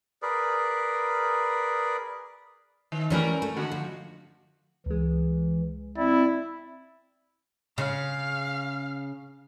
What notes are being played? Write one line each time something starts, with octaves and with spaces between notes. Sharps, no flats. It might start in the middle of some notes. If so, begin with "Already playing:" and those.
G#4 A#4 B4 D5
D#3
E3 G3 A3 C#4 A#4 B4
A3
D3 F#4
F3
C#2 E3 G#3
C4 E4 D5
C#3 F5